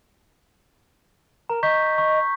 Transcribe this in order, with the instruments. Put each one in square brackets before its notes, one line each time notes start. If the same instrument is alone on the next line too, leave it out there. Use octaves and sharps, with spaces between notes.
[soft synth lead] A#4 [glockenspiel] A#5
[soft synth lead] D#5 [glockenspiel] C#6 G6 B6
[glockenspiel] C#6